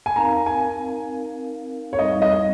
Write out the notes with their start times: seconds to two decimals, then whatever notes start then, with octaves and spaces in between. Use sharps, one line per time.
0.06 G#5
0.16 C4 D#4 A#4 F5 A#5
0.46 G#5
1.93 C#5
1.99 G3 C4 D#4 D#5
2.22 D#5